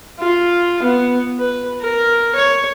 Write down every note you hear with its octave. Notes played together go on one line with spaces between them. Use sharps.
F4
B3
B4
A#4
C#5